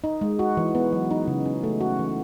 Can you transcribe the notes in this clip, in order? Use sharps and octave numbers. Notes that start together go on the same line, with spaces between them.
D#4
G#3
F#4
E3
B3
F#3
D#4
C#3
C#4
A3
F#4
E3